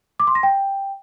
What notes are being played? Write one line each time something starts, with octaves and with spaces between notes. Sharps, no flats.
D6
C6
A#6
G5